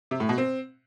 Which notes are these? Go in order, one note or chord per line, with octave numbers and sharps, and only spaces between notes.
C3
A2
B2
C4